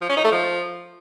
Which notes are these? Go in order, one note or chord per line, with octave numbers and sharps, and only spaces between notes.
F3
C#4
D#4
A3
F3